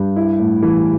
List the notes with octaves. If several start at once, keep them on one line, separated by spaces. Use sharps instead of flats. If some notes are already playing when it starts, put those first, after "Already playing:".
Already playing: G2 G4
E4
A2
E3